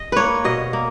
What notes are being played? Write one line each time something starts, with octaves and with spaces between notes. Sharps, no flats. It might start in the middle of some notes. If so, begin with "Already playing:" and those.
Already playing: D#5
A#3 B4 C#5
B2 D#5
A#3